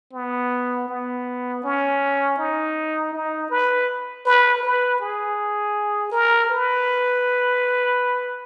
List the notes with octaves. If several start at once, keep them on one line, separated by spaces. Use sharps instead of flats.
B3
B3
C#4
D#4
D#4
B4
B4
B4
G#4
A#4
B4